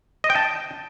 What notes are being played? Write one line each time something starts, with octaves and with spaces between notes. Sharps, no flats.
D#5
G5
A5